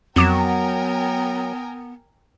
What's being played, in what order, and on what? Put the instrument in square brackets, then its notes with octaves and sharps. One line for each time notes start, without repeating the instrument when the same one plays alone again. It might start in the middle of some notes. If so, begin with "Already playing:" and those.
[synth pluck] F2 D6 E7 [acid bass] F#3 [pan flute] B3 [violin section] A#4 G5 G#5